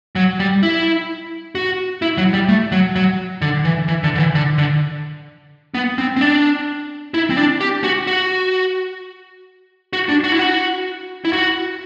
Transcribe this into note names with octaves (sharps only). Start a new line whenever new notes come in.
F#3
G3
E4
F#4
E4
F#3
G3
A3
F#3
F#3
D3
E3
E3
D3
D3
E3
D3
D3
B3
C4
C4
D4
E4
C4
D4
G4
F#4
F#4
F#4
D4
F#4
E4
F#4
E4
F#4